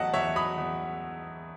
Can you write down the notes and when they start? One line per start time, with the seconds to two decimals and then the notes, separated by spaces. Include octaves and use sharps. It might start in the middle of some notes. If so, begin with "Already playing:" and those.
Already playing: E2 F#3 A3 D#5 F#5 A5
0.13 E2 C#5 E5
0.36 F#3 B5 D#6
0.58 E2